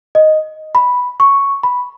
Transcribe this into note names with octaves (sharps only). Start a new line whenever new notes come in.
D#5
B5
C#6
B5